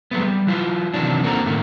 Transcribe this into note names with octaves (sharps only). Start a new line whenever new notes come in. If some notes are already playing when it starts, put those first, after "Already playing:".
F#3 G#3 A3 B3
G3
F#3 E4 F4
C3 D#3 E3 F#3 D4
E2 A#3 C4 F#4 A4 A#5
A2 D#3 A3 A#3